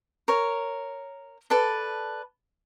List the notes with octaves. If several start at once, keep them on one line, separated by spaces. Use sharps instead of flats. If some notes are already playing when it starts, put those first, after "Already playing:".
A#4 C#5
A4 B4 D5 A5